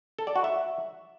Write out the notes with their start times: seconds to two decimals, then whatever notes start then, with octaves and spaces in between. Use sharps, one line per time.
0.19 A4
0.27 D5
0.36 F#4
0.44 E5